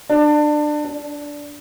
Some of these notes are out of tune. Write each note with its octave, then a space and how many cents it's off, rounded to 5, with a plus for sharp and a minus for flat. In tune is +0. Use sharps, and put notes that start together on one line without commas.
D4 +25
D4 -10